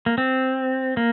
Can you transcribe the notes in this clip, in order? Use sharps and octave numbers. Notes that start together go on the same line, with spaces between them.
A#3
C4
A#3